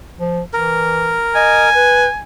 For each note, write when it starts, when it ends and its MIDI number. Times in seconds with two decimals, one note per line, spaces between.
0.19 0.41 53
0.54 1.19 52
0.54 1.70 70
1.35 1.67 75
1.35 2.23 80
1.73 2.07 71